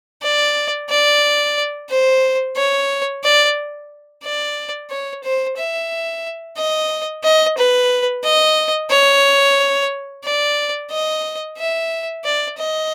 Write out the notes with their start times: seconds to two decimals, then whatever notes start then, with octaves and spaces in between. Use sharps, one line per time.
0.23 D5
0.90 D5
1.90 C5
2.56 C#5
3.24 D5
4.23 D5
4.90 C#5
5.24 C5
5.58 E5
6.57 D#5
7.24 D#5
7.57 B4
8.24 D#5
8.91 C#5
10.24 D5
10.91 D#5
11.58 E5
12.25 D5
12.58 D#5